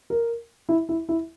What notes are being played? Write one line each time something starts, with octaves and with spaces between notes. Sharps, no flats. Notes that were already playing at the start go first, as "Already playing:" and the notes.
A#4
E4
E4
E4